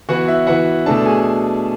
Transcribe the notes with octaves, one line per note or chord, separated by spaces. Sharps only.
E3 B3 E4 F#4 F#5
E4 E5
E3 B3 E4 F#4 F#5
B2 A3 D4 A4 A5
G#4 G#5